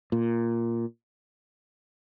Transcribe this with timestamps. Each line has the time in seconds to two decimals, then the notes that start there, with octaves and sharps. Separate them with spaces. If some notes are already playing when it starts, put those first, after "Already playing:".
0.12 A#2